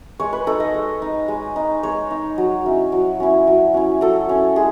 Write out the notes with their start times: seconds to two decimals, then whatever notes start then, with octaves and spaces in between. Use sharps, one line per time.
0.20 G#3 C#5
0.33 B4
0.47 D#4 A4
0.60 D#5
0.74 G#3
1.02 D#4
1.28 G#3
1.56 D#4
1.83 G#3 C#5
2.11 D#4
2.38 F#3
2.65 C#4 E4
2.92 F#3
3.20 C#4 E4
3.47 F#3
3.74 C#4 E4
4.01 F#3 A4
4.29 C#4 E4
4.56 G#3 G#4